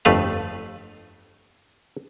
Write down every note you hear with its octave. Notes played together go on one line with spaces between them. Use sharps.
G1 F2 A3 B4 F5